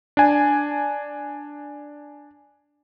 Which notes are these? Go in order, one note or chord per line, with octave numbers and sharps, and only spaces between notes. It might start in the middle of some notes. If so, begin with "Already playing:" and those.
D4 G#5